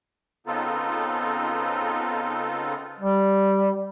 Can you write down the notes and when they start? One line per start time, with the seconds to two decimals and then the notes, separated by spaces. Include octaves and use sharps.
0.47 C#3 B3 C4 D#4 F4 A4
3.00 G3